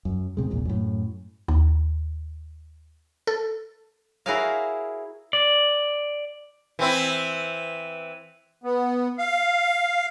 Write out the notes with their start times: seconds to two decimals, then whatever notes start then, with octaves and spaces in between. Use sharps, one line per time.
0.05 F#2
0.37 G#2 C3 G#3
0.50 A#1 E2 A#2
0.65 F#2 A2
1.48 D#2
3.27 A4
4.26 E4 F#4 G#4 A#4 C#5 F5
5.33 D5
6.79 E3 C4 E4
8.64 B3
9.18 F5